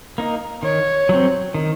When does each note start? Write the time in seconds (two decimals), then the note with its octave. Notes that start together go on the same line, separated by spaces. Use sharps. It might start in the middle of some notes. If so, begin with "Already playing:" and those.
0.18 A#3 D#4
0.63 D#3 C#5
1.09 F#3 C4
1.54 D#3